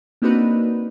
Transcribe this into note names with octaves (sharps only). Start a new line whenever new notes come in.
A#3 C4 D4 D#4 F#4 B4